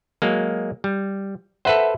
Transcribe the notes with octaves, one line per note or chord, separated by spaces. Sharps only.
F#3 G#3 A#3
G3
A4 B4 C5 E5 F#5